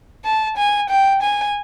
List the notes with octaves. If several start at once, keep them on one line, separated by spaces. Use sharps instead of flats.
A5
G#5
G5
G#5